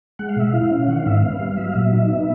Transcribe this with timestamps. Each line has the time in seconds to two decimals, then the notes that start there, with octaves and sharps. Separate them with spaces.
0.19 G#3 F#5
0.29 F5
0.36 B2 E5
0.50 E4 F5
0.71 C#4
0.88 D#3 F#5
0.98 F5
1.06 G#2 E5
1.17 F5
1.23 B3
1.40 G3
1.57 F#3 E5
1.65 F5
1.74 A#2 E5
1.92 D#4
2.09 B3